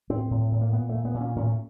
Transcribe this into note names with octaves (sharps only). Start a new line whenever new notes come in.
A2 C4
A2
A2
A#3
A#2 B3
A#2 A3
B3
A#2
C#4
A2 C#4